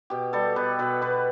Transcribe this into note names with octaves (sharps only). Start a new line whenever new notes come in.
B2 G4
G3 A4
B2 B4
B2 B4
B2 B4